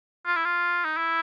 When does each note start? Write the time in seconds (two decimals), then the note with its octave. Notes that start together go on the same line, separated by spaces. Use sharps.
0.26 F4
0.36 E4
0.45 F4
0.85 D#4
0.97 E4